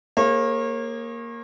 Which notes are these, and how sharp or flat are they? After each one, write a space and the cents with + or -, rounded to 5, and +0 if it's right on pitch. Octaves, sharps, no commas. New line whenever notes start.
A#3 +0 G#4 +0 C#5 -35